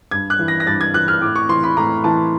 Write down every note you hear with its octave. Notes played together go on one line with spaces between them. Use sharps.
G2 G#6
F#6
E3
A#6
A#6
G2 A6
G#6
E3 F#6
F6
A2 D6
C#6
E3 C6
B5
A2 A#5
E3 A5